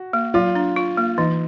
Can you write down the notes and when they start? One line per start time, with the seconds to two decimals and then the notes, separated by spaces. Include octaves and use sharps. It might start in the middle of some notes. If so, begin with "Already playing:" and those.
Already playing: F#4
0.13 A#3
0.34 F#3 F4
0.55 D4
0.76 F4
0.97 A#3
1.18 E3 D#4